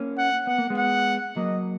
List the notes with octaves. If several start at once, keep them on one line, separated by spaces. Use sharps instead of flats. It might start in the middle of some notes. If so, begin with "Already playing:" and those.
Already playing: A#3 C#4
F#5
B3 F#5
A#3
G#3 B3
F#5
F#3 A#3 D#5